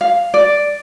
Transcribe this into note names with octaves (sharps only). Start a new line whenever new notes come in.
F5
D5